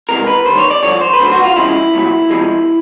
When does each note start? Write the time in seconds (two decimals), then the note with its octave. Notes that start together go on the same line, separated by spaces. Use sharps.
0.09 C#2 C3 E3 G#3 A#4
0.27 B4
0.46 D#2 D#3 G3 C5
0.58 C#5
0.71 D5
0.83 G2 D3 F3 C#5
1.01 C5
1.13 B4
1.19 D2 D3 F#3 C5
1.32 F#4
1.44 F4
1.56 F2 C#3 F3 G#3 E4
1.94 C2 A#2 F#3
2.30 F2 C3 F3 G#3